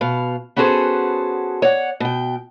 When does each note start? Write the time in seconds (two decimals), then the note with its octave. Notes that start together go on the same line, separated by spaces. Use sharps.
0.01 B2 F5
0.57 B3 C#4 F#4 G#4 A4 C5
1.62 C#5 D5 F#5
2.00 B2 G5